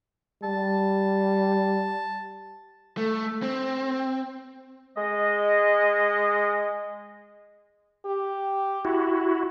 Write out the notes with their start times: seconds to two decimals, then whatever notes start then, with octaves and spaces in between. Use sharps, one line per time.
0.44 G3 A5
2.97 A3
3.42 C4
4.97 G#3 D#5
8.06 G4
8.85 E4 F#4